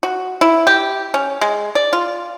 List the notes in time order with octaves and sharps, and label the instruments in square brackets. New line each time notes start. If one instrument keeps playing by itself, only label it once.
[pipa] F#4
E4
G4
C#4
G#3
D5
F4